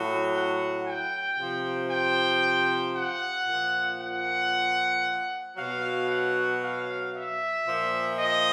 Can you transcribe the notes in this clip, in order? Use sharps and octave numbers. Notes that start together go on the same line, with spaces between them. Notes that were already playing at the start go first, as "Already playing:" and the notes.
Already playing: A2 F#3
F#5
G5
C3 F3
G5
F#5
A#2 F3
F#5
B2 F#3 F5
F#5
F5
E5
A#2 F3
D#5